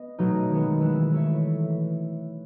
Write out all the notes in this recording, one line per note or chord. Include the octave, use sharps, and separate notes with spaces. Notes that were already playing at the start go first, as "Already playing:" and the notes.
Already playing: B3 D#5
B2 F#3 A3 D#4
D#3 G#3 B3
E3 B3 E4 B4
A3 E4 A4 C#5 E5